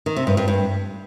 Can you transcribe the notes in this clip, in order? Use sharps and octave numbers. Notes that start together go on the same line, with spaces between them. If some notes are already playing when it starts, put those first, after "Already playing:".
D#3
C3
G2
G2
G2